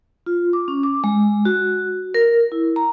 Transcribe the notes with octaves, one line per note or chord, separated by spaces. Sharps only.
F4
D6
C#4
D6
G#3
F#4
A#4
E4
A#5